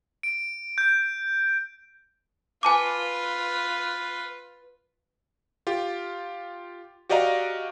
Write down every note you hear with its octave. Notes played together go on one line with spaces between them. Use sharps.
D7
G6
F4 B4 G#5 A5 D6
F4 G4
F#4 G4 D5 D#5 F5 A#5